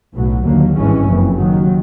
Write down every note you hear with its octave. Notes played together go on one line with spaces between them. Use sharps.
B1 A2 F#3
D#2 D3 F#3 A#3
G#1 G2 E3 G#3 C#4
F#1 F2 C#3 E3
D#2 D#3 F#3